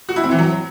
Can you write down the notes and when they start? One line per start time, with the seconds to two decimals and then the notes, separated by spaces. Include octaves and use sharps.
0.09 F#4
0.16 E4
0.24 C4
0.31 E3
0.38 F#3